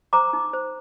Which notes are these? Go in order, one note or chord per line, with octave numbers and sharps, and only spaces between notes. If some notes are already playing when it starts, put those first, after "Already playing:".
C5 A#5 D6
D#4
C5